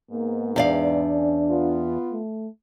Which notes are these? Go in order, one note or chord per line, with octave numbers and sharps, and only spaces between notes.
G#2 A#3 B3
E2 D4 D5 F5
C#4
B3 F4
A3